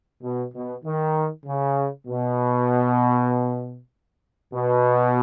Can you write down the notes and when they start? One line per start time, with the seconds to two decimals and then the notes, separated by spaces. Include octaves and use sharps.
0.23 B2
0.54 B2
0.85 D#3
1.46 C#3
2.08 B2
4.53 B2